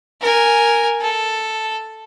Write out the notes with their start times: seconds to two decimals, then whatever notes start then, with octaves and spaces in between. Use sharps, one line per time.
0.21 A#4 G#5
1.01 A4